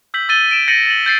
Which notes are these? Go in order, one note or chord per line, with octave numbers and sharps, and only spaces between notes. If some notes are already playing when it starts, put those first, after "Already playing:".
E6 G6 B6 F#7
E6 A6 D#7 G7
D7 E7
G6 A6 A#6 C#7 D#7 F#7
A6 D#7 F#7
G6 A6 C7 D#7